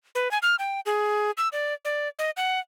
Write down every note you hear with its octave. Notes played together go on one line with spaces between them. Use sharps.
B4
G#5
F6
G5
G#4
E6
D5
D5
D#5
F#5